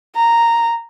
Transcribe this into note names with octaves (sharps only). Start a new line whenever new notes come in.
A#5